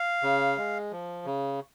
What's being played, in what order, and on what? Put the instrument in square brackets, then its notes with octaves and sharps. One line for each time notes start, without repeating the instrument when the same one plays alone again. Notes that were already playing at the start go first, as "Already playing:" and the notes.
Already playing: [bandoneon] F5
C#3
G#3
F3
C#3